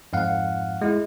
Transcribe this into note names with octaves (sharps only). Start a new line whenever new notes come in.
F2 G#2 F5 F#5
G#3 E4